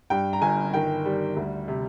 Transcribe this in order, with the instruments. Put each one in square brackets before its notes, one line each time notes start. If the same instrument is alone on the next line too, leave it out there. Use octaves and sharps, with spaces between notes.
[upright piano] G2 G5
A#5
G1 G#5
D#3 G5
G3
D2
C3